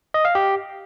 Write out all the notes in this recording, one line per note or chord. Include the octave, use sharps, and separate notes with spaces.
D#5
F5
G4